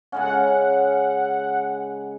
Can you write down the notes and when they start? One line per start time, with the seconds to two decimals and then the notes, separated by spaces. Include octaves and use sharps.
0.12 C#3 G#3 C#4 F#5